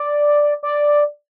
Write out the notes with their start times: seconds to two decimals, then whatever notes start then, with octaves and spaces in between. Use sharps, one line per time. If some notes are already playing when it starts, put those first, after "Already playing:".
Already playing: D5
0.63 D5